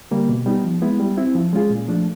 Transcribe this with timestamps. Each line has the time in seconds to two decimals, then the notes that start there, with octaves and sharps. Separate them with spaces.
0.11 D3 G3 A#3
0.29 B2
0.46 G3 B3 D#4
0.64 F3
0.82 G#3 B3 E4
1.00 G3
1.18 C4 E4
1.35 F3
1.53 G#3 C#4 F4 G#4
1.70 A#2
1.88 F3 A3 D4